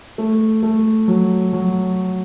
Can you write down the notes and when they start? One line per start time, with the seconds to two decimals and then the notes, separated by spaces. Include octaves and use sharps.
0.18 A3
0.63 A3
1.08 F#3
1.53 F#3